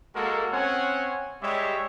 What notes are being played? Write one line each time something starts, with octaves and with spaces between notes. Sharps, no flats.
G#3 A#3 F#4 A4 A#4
C4 C#4 C#5 F#5 G#5
G3 G#3 G4 C#5 E5